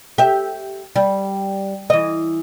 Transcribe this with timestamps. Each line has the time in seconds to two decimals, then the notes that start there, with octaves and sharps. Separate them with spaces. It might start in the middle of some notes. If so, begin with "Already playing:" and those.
0.18 G4 E5
0.96 G3
1.90 E3 D#5